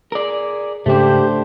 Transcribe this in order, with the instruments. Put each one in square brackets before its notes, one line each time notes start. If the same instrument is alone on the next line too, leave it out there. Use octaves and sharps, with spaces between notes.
[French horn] G#4 [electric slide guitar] A#4 D5
[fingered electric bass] G#2 C#3 [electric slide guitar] A3 D4 [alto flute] G4 [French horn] C5